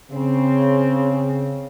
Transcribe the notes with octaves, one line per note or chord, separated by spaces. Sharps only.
C#3 C4